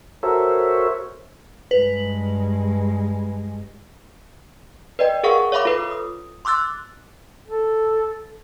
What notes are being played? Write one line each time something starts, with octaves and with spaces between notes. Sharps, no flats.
F#4 A4 A#4 C5 C#5 E5
G2 G#3 B4
B4 D5 D#5 G5
G#4 A#4 F5 F#5 C#6
C#5 E5 F5 B5 D6
F4 A4 B4
D#6
C6 D6 E6 F#6 A6
A4